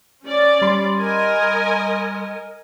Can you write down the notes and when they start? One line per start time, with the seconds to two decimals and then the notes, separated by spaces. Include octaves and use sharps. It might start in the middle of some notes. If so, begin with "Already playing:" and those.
0.24 C#4 D5
0.62 G3 B5 C6
0.97 A#4 D#5 G#5